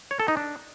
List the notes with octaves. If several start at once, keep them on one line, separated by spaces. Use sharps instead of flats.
C#5
A4
D#4
D4